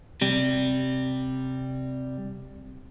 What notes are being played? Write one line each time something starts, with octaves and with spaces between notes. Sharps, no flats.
C3 G3